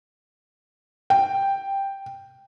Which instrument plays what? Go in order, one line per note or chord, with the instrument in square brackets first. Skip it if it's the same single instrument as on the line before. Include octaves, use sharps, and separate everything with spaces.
[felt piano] G5